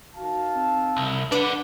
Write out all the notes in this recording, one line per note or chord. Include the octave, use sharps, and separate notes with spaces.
D#3 F#4 F5 A5
C4
C2
D4 B4 D5 F#5 D6